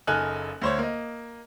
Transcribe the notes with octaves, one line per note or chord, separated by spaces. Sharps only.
F#1 D#4 A4 G#5 F6 F#6
D2 C5 C#5
A#3 D#5